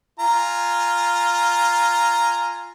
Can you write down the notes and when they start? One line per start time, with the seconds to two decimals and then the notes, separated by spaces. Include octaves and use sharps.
0.20 F4 G#5 A#5